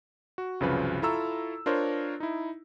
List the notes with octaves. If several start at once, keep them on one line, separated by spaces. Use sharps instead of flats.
F#4
C2 F#2 C#3 F3 F#4 B4
E4 F4 A4 A#5 C#6 E6
D4 F4 A#4 C5 C#5
D#4 E4